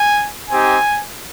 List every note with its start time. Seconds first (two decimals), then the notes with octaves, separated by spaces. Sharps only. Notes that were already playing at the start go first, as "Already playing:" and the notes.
Already playing: G#5
0.50 C4 D#4 G4 G#5